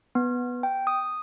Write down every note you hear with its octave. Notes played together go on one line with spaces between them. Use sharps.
B3
G5
D#6